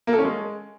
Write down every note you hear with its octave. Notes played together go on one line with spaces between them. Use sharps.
A#3
A4
C#4
G#3